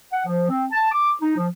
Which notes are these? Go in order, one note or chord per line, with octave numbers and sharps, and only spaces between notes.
F#5
F3
C4
A5
D6
D#4
F3